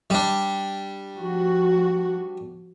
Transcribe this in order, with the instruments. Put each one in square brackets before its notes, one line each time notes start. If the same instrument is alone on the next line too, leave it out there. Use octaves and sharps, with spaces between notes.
[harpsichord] G3 D4
[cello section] F3 F#4